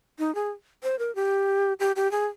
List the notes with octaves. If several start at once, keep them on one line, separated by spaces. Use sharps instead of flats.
D#4
G#4
C5
A#4
G4
G4
G4
G#4